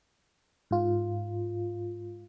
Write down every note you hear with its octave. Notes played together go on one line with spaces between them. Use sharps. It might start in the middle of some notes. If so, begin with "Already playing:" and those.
G#2 F4